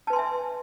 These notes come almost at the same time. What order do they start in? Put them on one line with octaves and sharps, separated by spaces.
A5 B4 C6 G#5 E5